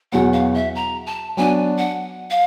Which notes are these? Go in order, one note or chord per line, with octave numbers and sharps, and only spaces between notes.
E2 B2 F#3 B3 F#5
F5
E5
A#5
A5
F#3 B3 D4 G#5
F#5
F5